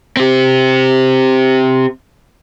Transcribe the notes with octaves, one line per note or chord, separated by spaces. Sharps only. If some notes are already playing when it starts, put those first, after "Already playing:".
C4 G4